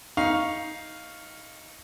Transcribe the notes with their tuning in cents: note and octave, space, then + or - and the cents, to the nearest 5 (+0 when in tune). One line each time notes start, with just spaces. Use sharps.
D#4 +15 F5 +0 C#6 +0